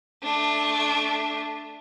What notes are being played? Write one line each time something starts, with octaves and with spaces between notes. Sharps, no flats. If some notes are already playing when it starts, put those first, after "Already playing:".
A3 D4